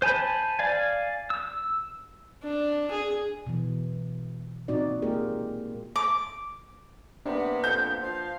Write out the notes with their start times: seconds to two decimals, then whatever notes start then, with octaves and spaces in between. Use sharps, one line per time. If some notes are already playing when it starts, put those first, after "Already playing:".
0.02 C5 G#5 A5 B5
0.59 D5 F5 G#5
1.30 E6
2.43 D4
2.91 G#4
3.47 B2 E3
4.68 A#2 C4 D#4 F#4 D5
5.02 G#3 A#3 F4 G4 G#4 A#4
5.96 D6
7.26 C3 A#3 B3 D4
7.64 F2 G6
8.02 F3 F5